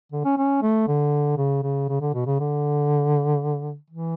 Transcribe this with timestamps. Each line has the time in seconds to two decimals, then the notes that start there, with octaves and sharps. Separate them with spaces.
0.12 D3
0.25 C#4
0.37 C#4
0.62 A3
0.88 D3
1.37 C#3
1.63 C#3
1.89 C#3
2.01 D3
2.14 B2
2.26 C#3
2.40 D3
3.90 E3